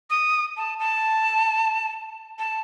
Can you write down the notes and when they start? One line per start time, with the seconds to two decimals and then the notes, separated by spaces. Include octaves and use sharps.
0.10 D#6
0.57 A5
0.80 A5
2.39 A5